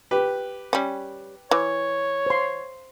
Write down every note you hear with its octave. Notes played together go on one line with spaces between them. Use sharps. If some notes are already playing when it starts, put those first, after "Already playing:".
G4 B4
G3 C#4
E3 C#5
C5 C6